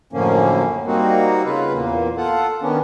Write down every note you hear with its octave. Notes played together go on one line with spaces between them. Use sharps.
F#2 A2 D3 F3 A#3 C#4
G3 A#3 C4 D#4 F#4
C#3 F4 B4
E2 A#2 A#3
F4 A4 F#5
D#3 B3 C#4 D4